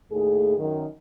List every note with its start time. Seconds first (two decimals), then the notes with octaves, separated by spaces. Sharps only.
0.11 D#2 A2 A3 G#4
0.58 F#2 D#3